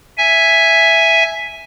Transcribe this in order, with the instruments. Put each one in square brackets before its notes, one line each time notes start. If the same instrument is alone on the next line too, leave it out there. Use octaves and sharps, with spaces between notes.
[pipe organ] E5 G#5